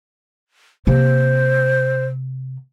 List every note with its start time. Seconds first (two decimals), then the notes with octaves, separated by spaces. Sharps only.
0.87 C3 A#3 C5